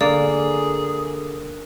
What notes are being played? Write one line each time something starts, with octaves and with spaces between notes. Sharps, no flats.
D3 A#3 G#4 D5